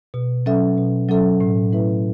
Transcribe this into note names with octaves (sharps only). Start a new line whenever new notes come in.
B2
F#3 C#4 A4 E5
B2
F#3 C#4 A4 E5
A2
A3 E4 B4 E5